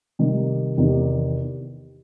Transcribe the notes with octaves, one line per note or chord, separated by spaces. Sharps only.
C3 D#3 G3
E2 C3 D#3